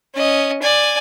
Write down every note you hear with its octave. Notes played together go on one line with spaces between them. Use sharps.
C#4 D#5
D5 G#5